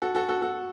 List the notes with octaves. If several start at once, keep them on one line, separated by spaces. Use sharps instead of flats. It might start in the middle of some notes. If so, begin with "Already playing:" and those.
F#4 A4
F#4 A4
F#4 A4
F#4 A4